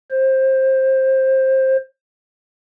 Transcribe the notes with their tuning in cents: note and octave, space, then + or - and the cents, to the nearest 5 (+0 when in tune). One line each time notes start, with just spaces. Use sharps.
C5 +20